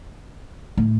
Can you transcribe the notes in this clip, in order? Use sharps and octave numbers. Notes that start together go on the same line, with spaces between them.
A2